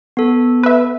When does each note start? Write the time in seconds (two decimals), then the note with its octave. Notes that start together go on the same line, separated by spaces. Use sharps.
0.17 B3 A4
0.63 B4 E5